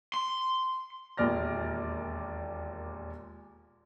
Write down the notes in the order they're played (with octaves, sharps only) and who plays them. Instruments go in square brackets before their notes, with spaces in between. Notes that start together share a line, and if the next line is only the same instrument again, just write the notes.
[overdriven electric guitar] C6
[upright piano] E1 D#2 A#2 D5 F6 A#6